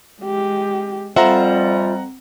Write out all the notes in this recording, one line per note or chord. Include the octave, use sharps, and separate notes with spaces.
G#3 G4
F2 G3 C4 F4 C5 E5 F#5 A#5